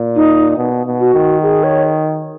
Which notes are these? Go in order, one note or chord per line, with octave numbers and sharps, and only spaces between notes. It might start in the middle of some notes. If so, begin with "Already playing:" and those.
Already playing: A#2
D#4
B2
B2
F#4
D#3
G#4
C#5